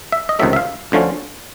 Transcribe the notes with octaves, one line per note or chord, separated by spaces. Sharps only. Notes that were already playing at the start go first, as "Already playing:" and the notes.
E5
D#5
C#2 C3 D#3 F#3 A3 E5
E5
F5
D2 D3 F3 A3 C#4